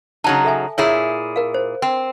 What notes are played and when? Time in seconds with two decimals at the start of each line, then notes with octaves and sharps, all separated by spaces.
0.24 C#3 F#3 D#4 A5
0.45 A4 E5 G#5
0.78 A#2 E4 G#4 C#5 E6
1.36 A#4 F5
1.54 C5
1.82 C4